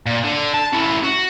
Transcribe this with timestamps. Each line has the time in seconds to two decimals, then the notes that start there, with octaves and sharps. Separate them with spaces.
0.06 A#2
0.24 D3
0.54 A5
0.73 C#4 E4
1.03 F#4